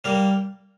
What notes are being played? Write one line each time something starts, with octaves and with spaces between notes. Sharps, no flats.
G3 A#3 A#4